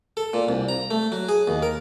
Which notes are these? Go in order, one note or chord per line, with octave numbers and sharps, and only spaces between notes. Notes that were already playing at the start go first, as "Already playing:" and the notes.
A4
A#2
C2
A#5
A3
F#3
G#4
D#2
A#4